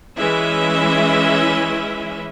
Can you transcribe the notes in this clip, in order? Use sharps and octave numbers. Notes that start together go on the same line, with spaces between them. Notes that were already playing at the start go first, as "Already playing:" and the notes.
E3 G#3 C#4 E4 E5